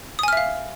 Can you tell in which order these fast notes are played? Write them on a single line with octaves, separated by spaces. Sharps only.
D#6 G#5 F6 E5 F5